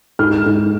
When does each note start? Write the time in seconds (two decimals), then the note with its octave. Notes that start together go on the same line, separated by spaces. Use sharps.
0.19 G#2 F6
0.46 G#2